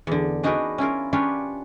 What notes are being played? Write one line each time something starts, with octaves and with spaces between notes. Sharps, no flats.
E2 D3
D4 D#4 F#4 G#4 A#4 B4
C#4 E4 F4 A#4
C#4 D4 F4 G4 B4 C#5